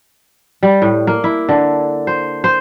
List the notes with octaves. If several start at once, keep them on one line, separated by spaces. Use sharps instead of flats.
G3
A2
A#3
E4
D3
C5
C5